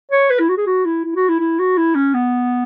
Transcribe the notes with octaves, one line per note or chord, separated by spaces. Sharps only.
C#5
B4
E4
F#4
G#4
F#4
E4
E4
F#4
E4
E4
F#4
E4
C#4
B3